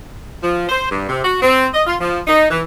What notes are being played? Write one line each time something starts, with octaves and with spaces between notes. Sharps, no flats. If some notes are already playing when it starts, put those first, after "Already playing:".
F3
C5
G2
C3
F#4
C4
D#5
F4
F3
D#4
E3